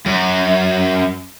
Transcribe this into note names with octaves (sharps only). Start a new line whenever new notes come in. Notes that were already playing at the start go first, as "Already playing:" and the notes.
F#2